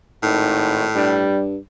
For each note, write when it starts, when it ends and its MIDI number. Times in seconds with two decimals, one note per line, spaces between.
0.23 0.87 32
0.23 1.29 45
0.23 0.80 51
0.96 1.57 43
0.96 1.42 55